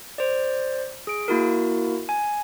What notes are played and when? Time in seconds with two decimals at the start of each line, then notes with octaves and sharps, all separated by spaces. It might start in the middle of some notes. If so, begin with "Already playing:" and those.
0.18 C5 D5
1.07 G#4 D7
1.28 A#3 E4 F#4 A#4
2.09 G#5